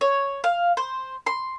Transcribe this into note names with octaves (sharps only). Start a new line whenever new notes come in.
C#5
F5
C5
C6